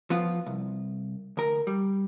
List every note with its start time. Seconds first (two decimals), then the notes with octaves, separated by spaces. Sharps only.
0.10 F3 B3 F4
0.46 C2
1.37 D2 A#4
1.67 G3